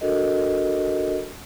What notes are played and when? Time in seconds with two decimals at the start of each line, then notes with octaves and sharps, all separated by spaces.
0.01 D4 F#4 A4 A#4 D#5